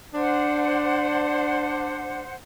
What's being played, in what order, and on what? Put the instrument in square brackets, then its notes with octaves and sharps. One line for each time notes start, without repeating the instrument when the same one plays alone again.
[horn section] D4 [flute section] C5 F#5